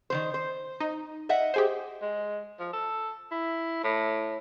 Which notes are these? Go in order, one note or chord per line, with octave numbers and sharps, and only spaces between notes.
D#3 F#3 C5
C5
D#4
D#5 E5 F#5
G4 G#4 C5
G#3
F3
A4
E4
A2